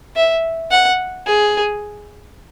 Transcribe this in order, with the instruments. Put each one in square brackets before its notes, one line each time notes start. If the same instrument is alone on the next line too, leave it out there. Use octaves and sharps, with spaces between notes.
[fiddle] E5
F#5
G#4